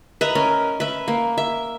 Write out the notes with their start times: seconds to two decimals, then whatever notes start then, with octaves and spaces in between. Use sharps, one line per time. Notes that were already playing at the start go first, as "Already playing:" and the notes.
0.21 B4 D#5 E5 A#5
0.35 C#4 A#4
0.80 B4 E5
1.08 A#3
1.38 E5